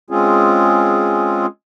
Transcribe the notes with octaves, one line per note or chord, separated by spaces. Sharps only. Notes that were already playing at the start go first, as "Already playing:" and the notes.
G#3 C4 C#4 F4 G#4